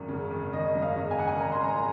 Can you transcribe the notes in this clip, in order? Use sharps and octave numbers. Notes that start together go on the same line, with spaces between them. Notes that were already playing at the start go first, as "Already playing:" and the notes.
Already playing: G#1 F#2
C#3
G#1
G#1 D#5
F#2
F5
C#3
G#5
G#1 F#5
G#5
G#1 A#5
C6
F#2 A#5